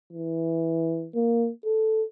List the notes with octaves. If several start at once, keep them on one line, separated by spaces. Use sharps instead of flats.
E3
A#3
A4